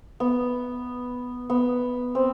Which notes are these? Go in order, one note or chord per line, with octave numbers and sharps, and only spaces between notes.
B3
B3
C4